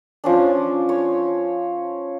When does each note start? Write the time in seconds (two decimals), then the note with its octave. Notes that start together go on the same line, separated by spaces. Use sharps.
0.24 F3 C#4 D4
0.89 C#5